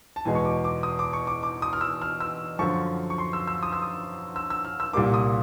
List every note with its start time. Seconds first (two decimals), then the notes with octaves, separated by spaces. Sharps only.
0.16 A5
0.25 E2 B2 G#3 G#5
0.35 C#6
0.45 D6
0.64 D6
0.83 D#6
0.99 D6
1.13 C#6
1.27 D6
1.43 D6
1.62 D#6
1.73 F6
1.81 E6
2.02 F6
2.20 E6
2.59 F#2 D3 F3 C#6
3.10 C#6
3.18 C6
3.33 E6
3.47 E6
3.63 D#6
3.73 E6
3.82 D#6
4.36 E6
4.50 E6
4.65 F6
4.80 E6
4.93 C2 A#2 G3 A#3 D6
5.14 D#6